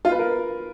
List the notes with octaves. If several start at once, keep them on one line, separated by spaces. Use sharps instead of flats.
F4
B4
A#4